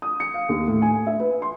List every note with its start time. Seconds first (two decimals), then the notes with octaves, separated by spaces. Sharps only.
0.02 D#6
0.20 C#7
0.34 F5
0.49 D#2
0.68 A2
0.82 G#5
1.07 E5
1.19 B4
1.42 C6